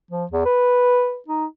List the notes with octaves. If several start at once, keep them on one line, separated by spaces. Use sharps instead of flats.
F3
E2
B4
D#4